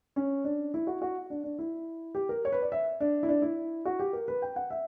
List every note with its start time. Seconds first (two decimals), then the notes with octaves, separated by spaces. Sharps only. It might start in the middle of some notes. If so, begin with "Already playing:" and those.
0.16 C#4
0.45 D4
0.74 E4
0.87 F#4
1.02 F#4
1.30 D4
1.44 D4
1.59 E4
2.15 G4
2.29 A#4
2.45 C#5
2.52 B4
2.62 D5
2.72 E5
3.00 D4
3.23 E4
3.29 D4
3.42 E4
3.85 F#4
3.99 G4
4.13 A#4
4.28 B4
4.42 G5
4.56 F#5
4.70 E5